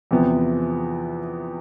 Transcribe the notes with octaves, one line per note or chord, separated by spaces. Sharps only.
E2 C3 F3 B3